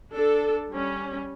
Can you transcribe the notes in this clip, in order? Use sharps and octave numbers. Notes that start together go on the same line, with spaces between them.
D4 A4
G3 C#4